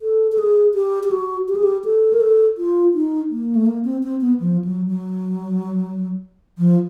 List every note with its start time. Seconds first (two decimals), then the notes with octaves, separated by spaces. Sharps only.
0.02 A4
0.32 A4
0.38 G#4
0.74 G4
1.03 G4
1.11 F#4
1.48 G4
1.55 G#4
1.63 G4
1.85 A4
2.13 A#4
2.21 A4
2.58 F4
2.94 D#4
3.31 A#3
3.55 A3
3.66 A#3
3.85 C4
4.03 C4
4.21 B3
4.40 F3
4.64 F#3
4.88 F#3
6.58 F3